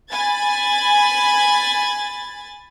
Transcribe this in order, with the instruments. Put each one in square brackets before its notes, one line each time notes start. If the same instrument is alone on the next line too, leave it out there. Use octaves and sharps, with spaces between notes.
[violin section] G#5 B5 G#6 A6